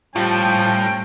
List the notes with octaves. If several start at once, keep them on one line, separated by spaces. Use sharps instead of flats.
A2 F3 G3 C#4 F4 G5 A5